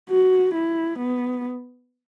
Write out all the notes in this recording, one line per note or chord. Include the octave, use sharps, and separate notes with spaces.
F#4
E4
B3